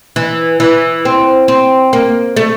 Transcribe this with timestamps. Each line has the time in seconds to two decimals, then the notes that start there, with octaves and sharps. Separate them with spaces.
0.16 E3
0.60 E3
1.05 C4
1.48 C4
1.93 A#3
2.36 A3